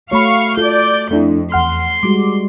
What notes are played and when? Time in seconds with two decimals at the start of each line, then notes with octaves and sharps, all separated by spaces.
0.11 A3 F#4 C#5 F5 B5 C#6
0.57 F4 A4 D5 G6
1.11 F2 A3 D4 E4
1.52 E2 F#5 C6 F6
2.03 G3 G#3 F#4 D6